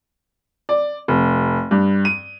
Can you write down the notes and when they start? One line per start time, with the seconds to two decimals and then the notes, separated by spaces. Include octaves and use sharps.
0.69 D5
1.08 F1
1.71 G2
2.05 D#7